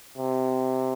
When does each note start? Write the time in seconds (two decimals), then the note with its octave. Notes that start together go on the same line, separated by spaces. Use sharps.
0.18 C3